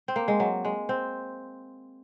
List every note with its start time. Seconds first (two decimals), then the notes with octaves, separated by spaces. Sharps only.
0.08 C4
0.16 A#3
0.28 G#3
0.40 F#3
0.65 G#3
0.89 C4